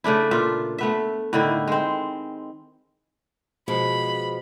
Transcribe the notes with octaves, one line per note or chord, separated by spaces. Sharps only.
C#3 A3 D4 E4
A#2 F4 E5
A3 B3 E5
A2 D3 D#3 E4
G#3 C4
B2 F3 G#3 B5